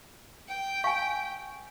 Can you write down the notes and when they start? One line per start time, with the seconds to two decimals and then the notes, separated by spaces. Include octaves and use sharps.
0.48 G5
0.84 F5 G#5 C#6